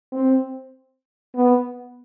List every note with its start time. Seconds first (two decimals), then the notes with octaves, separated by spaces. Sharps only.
0.12 C4
1.35 B3